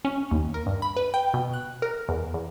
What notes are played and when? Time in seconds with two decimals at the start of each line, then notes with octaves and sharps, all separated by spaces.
0.05 C#4
0.31 D#2
0.54 A#4
0.66 G2
0.82 B5
0.97 B4
1.14 G5
1.34 B2
1.53 F#6
1.82 A#4
2.09 E2
2.34 E2